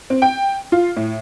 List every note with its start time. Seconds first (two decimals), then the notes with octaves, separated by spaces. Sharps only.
0.10 C4
0.22 G5
0.72 F4
0.96 A2